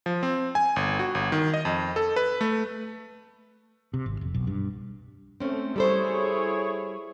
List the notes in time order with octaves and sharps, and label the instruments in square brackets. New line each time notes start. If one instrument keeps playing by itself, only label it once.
[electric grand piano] F3
C4
G#5
G1
F#4
G1
D#3
D#5
F2
A4
B4
A3
[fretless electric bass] C3
G#1
F1
B1
G2
[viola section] A3 [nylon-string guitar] C4 C#4
[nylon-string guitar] G3 A4 C5 [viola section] E4 G#4 C#5